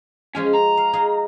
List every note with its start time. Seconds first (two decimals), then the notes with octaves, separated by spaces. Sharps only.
0.35 F3 G#3 C#4 G#5
0.53 A#5
0.77 F5
0.93 D#4 G#4 F5